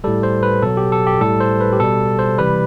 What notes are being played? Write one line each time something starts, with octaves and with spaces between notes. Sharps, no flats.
A2 G3 A4
C5
B4
B2 F#3 A4
G4
A4
G4
A2 G3 A4
C5
B4
G4
B2 G3 A4
C5
C3 E3 G3 B4